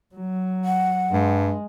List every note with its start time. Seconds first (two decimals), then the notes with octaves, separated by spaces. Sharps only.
0.15 F#3
0.65 F#5
1.11 G2 G#3